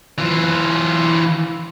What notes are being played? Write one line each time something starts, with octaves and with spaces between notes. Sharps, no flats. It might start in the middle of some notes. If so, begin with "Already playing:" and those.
E3 F4